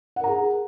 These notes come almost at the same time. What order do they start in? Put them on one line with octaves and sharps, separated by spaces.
F#5 A#4 A#5 G#4